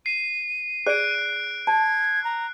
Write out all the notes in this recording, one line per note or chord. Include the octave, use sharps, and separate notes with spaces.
C7 D#7
G#4 D5 F#6 D7
A5 G#6
A#5